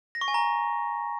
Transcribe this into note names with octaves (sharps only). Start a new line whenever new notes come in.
A#6
C#6
G#5
A#5